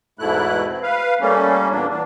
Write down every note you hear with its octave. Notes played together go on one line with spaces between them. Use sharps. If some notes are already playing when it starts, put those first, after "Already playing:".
E2 G#2 B2 A3 E4 F#6
C4
B4 F5
G3 A3 A#3 C#4
E2 A#2 A#3 D4
E3 D4